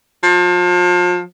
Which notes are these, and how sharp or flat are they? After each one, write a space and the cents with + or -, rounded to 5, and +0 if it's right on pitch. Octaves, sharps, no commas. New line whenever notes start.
F3 +35